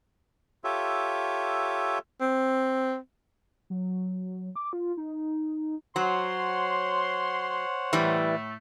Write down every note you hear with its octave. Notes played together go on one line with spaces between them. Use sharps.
F4 G4 A4 C#5 E5
C4
F#3
D6
F4
D#4
F#3 C5 C#5 F#5 C6
A2 E3 G3 A3